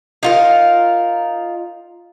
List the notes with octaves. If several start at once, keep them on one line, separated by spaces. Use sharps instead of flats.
D#4 F4 A#4